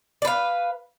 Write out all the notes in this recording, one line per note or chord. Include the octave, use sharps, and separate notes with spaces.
B4 D5 F5